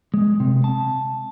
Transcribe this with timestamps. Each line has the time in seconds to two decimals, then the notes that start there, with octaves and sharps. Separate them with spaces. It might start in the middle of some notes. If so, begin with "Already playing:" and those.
0.14 G#3
0.40 C3
0.64 A5